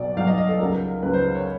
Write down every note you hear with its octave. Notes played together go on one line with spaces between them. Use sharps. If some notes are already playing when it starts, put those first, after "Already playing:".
Already playing: B1 B2 F#3 D5
B1 B2 F#3 F5
D#5
D#5
A4
C#2 C#3 F#3 A#4
C#2 C#3 F#3 B4
C5
C#5